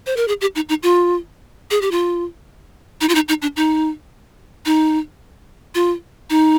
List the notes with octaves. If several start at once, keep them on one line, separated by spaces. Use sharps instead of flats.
C5
A#4
G#4
G4
D#4
D#4
F4
G#4
G4
F4
D#4
F4
D#4
D#4
D4
D#4
D#4
F4
D#4